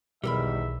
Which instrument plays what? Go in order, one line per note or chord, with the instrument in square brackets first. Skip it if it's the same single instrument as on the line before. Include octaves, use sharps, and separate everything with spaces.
[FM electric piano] B1 [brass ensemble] E2 D#3 [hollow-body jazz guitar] G3 A#4 B5 [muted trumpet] E5